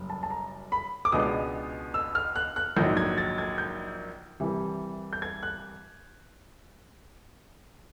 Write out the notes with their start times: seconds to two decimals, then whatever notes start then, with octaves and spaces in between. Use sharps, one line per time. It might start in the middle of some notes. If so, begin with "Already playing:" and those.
Already playing: F#1 F#2 G3
0.10 A5
0.23 A5
0.30 A#5
0.72 B5
1.05 D6
1.12 C#2 B2 G#3 B3 D4 D#6
1.94 E6
2.15 F6
2.36 F#6
2.56 F#6
2.76 A#1 G#2 D#3 F#3 G6
2.97 G#6
3.18 A6
3.38 G#6
3.58 G6
4.40 C2 C3 E3 G3
5.13 G6
5.22 G#6
5.43 F#6